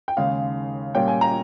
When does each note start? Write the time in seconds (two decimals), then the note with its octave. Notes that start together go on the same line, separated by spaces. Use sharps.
0.08 G5
0.17 D#2 C#3 G#3 D#4 F5
0.95 A#2 G3 A#3 C#4 G5
1.08 G#5
1.21 A#5